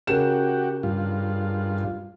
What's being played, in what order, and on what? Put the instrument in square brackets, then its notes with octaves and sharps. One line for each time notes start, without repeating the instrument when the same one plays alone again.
[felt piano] C#3 A#4 E7 [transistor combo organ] F#4 G4
[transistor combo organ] G2 F4